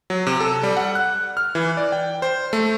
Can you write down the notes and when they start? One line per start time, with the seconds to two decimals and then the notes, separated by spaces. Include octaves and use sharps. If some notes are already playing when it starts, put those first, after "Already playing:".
0.10 F#3
0.27 C3
0.40 A4
0.63 G3
0.77 F#5
0.95 F#6
1.37 F6
1.55 E3
1.77 D5
1.92 G5
2.22 C5
2.53 A3